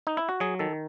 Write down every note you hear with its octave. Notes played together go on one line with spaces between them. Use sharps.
D#4
E4
F#4
F#3 G#4
D#3 A4